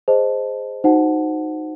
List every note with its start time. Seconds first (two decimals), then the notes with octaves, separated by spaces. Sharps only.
0.08 G#4 C5 D#5 A5
0.84 D#4 F#4 C5 F#5 A5